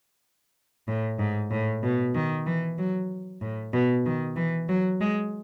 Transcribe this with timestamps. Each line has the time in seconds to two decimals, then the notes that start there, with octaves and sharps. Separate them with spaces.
0.88 A2
1.19 G#2
1.51 A2
1.83 B2
2.14 D#3
2.46 E3
2.78 F#3
3.41 A2
3.73 B2
4.05 D#3
4.36 E3
4.69 F#3
5.01 G#3